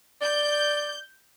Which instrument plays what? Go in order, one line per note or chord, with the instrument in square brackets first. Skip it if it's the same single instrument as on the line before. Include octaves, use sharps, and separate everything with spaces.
[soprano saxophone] D5 [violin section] G6